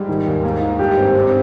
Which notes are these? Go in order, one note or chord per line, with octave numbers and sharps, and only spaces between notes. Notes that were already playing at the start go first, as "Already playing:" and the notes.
Already playing: G#2 G3
D#3
D#2
G#2 A#3
D#3
G2 G4
C4
C4